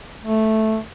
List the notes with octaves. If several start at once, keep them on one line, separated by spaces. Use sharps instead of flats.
A3